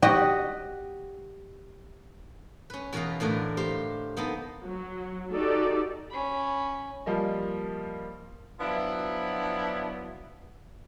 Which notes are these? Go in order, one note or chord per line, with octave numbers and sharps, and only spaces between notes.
F#4 G4 D#5
C#4 B4
E2 B2 A#4 B4 F5
A2 D3 E3 A3 A#4
G4 C5 F5
A#3 B3 D#4 A4
F#3
D#4 F#4 G4 A4 D5
C#4 B5
F3 G3 A#3 D#5
F3 F#3 B3 D4 E4